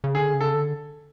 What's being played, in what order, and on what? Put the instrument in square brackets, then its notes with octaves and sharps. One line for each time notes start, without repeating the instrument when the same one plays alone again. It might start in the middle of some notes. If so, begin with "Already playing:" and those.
[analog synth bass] C#3
[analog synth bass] D3 [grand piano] G#4
[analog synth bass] C#3
[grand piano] A4
[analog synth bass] D3